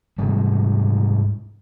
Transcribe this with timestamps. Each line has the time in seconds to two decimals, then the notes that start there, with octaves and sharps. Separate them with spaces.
0.18 G#2 C3 G3